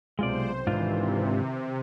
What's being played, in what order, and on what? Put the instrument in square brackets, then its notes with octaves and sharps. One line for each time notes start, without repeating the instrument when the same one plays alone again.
[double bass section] B1 C3 [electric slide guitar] G#3 F4 D5 [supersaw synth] C5
[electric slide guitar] G#2 D4 F4 [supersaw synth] C3 [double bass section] D#3 E3